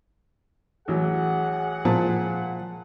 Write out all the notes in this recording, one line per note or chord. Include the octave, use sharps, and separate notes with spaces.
A1 E3 F#3 G#4 F#5
A#2 F3 A5